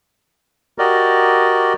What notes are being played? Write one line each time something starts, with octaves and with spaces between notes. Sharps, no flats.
F#4 G4 A#4 D5 D#5